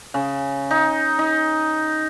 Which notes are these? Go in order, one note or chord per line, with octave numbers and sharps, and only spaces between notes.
C#3
D#4
D#4